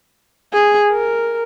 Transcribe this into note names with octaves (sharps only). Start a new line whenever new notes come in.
G#4
A#4